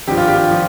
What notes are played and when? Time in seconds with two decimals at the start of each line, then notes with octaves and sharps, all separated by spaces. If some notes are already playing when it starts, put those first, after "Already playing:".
0.07 G#1 G2 F3 G4
0.17 F4
0.28 G4
0.51 F3